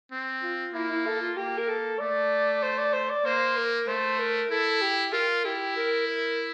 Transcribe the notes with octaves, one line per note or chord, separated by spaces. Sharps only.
C4
F4
A#3 E4
E4
A4
F4
A#3 G4
A#4
A4
A3 D5
C5
D5
C5
D5
A#3 C5
A#4
A3 C5
A#4
E4 A4
G4
F4 A#4
E4 G4
A#4
A#4